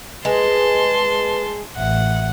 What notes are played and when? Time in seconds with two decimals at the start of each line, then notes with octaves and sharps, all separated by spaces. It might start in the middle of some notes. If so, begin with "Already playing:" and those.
0.25 G#3 B4 A5 C6
1.77 A1 E5 F#5